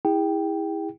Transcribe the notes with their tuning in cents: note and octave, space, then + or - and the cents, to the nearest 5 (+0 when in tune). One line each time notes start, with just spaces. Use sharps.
E4 -20 G#4 -35 G5 +0